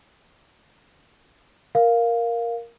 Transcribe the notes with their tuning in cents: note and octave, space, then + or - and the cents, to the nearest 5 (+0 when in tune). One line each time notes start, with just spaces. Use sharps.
A#4 +0 F5 +0